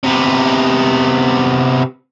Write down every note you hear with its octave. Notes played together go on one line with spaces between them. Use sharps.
C3 B3